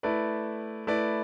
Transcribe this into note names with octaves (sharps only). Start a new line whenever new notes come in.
A3 E4 B4 D5
A3 E4 B4 D5